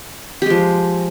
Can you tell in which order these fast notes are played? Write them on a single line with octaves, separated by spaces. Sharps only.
G4 G#3 F3